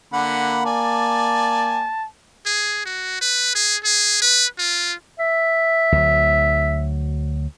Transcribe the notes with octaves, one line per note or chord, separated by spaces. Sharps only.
D3 A#3 F#5 B5
D5 G#5 A5
G#4
F#4
B4
G#4
G#4
B4
F4
E5
D2 F#3